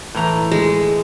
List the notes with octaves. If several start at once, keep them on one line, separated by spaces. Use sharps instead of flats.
A2 E3 A#5
G#3